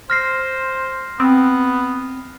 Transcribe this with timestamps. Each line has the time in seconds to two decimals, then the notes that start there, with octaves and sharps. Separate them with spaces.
0.10 C5 F6 A#6 C7
1.20 B3 C4